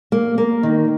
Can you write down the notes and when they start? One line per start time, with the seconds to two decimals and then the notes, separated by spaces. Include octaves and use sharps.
0.12 A#3
0.38 A#3
0.63 D#3